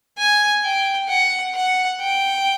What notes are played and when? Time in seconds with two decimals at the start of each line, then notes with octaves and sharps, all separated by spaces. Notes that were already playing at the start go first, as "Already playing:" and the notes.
0.18 G#5
0.64 G5
1.09 F#5
1.55 F#5
2.00 G5